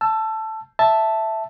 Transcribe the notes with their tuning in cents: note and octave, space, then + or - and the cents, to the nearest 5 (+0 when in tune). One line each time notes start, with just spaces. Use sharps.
A5 +0 E6 +25
E5 +0 A5 +0